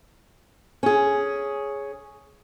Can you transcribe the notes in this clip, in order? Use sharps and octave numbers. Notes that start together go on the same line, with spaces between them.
C#4 G#4